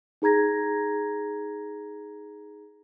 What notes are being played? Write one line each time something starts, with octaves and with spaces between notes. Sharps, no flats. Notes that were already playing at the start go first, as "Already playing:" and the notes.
D#4 G#4 A#5 G#6 A#6